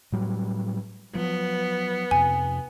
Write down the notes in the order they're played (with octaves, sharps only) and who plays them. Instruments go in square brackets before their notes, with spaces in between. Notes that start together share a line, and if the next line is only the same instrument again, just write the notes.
[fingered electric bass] A2 F#3 G3
[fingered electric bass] F3 F#3 [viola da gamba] B3
[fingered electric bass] F2 C3 [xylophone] G#5